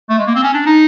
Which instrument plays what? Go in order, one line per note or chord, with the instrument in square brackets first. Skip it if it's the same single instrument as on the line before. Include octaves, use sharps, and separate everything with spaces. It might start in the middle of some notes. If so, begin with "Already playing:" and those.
[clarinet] A3
G#3
A#3
C4
C#4
D4
D#4